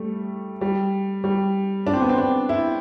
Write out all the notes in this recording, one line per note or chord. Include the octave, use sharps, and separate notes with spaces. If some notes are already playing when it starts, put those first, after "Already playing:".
Already playing: G3 A3
G3
G3
D4
C4
B3
C4
D4
E4